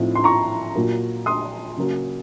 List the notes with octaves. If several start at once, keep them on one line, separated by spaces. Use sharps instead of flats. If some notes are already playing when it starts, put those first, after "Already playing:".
Already playing: A2 F3 C4 D#4
C6
A#5 C#6
A#2 F#3 A#3 F4
C6 D#6
C#3 F#3 A#3